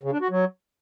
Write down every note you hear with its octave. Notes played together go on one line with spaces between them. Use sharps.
C#3
D4
F#4
F#3